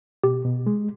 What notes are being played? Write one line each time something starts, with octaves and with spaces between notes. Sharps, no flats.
B2 G4
B2
G#3